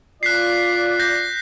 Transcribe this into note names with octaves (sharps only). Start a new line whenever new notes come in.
F4 D5 F#6 B6 C7
G6 A#6